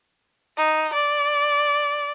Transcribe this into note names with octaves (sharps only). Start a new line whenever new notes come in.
D#4
D5